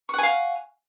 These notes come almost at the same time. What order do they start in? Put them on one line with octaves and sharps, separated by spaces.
C#6 F#5 G#5 F5